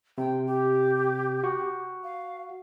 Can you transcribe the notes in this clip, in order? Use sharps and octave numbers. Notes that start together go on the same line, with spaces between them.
C3 G5
G4
F#4
F5